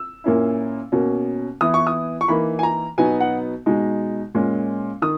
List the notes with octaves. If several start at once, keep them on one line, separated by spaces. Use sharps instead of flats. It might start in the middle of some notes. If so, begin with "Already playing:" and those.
Already playing: E6
A#2 A#3 C#4 E4
B2 A#3 C#4
E3 B3 E4 D#6
C#6
D#6
C#6
E3 A#3 D#4 B5
G#5
A#5
B2 F#3 B3 D#4 G#5
F#5
B2 G#3 D#4
A#2 G#3 C#4
D#3 D#6